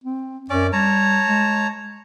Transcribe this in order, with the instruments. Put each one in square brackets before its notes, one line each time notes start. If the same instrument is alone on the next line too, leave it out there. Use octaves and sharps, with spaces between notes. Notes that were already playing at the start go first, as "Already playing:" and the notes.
[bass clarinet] C4
[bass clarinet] F#2 [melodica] C#4 D5 D6
[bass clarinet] G3 [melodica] C#5 A5 A#5
[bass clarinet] G#3